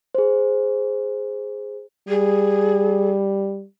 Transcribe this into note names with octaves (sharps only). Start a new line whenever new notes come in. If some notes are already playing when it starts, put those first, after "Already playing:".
G#4 C5
G3 G#4